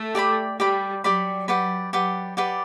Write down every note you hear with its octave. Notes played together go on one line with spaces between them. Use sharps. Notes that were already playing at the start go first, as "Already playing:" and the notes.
Already playing: A3
G4 D5 G5 B5
G3 G4 D5 G5 B5
F#3 G4 D5 G5 B5
G4 B4 D5 F#5
F#3 G4 B4 D5 F#5
G4 B4 D5 F#5